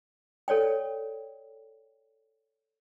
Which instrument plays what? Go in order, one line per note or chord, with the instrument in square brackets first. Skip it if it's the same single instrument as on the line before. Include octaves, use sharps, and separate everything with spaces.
[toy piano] A4 C#5 D5 G5